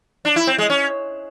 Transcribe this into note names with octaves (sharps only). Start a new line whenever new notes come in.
D4
E4
C4
G#3
C#4